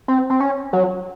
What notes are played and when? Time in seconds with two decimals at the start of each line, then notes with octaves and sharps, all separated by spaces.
0.08 C4
0.30 C4
0.40 C#4
0.73 F#3